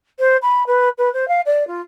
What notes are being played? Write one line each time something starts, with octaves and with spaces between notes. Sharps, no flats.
C5
B5
B4
B4
C5
F5
D5
F4